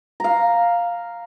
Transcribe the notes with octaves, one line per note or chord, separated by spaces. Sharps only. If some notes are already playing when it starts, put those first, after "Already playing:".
F5 A#5